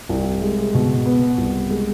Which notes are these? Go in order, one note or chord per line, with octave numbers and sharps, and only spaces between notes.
C2
G#3
B2
B3
C2
G#3